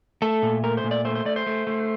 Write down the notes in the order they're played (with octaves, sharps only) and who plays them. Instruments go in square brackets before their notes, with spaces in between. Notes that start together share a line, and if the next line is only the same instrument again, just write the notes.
[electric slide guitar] A3 A4
A#2
A3 A#4
C5
A#2
D5
A3 C5
C5
A3 D5
C5
A3
A3